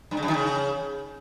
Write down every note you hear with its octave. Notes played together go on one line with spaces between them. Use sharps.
G2
C#3
F#2
D#3
C#3